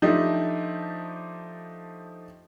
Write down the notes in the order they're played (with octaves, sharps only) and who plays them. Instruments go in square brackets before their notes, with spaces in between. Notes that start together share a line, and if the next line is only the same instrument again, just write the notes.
[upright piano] F3 A3 D4 D#4 G4